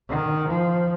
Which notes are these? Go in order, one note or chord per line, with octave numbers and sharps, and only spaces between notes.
D#3
F3